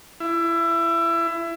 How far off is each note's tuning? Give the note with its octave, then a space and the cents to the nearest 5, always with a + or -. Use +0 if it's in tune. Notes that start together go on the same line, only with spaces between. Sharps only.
E4 +25